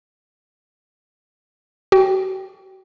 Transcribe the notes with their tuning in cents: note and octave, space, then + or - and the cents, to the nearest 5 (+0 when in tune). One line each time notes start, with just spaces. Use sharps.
F#4 +40 G5 +0